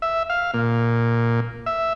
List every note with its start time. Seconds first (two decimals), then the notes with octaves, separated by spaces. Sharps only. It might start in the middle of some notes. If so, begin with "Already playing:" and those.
0.02 E5
0.30 F5
0.54 A#2
1.66 E5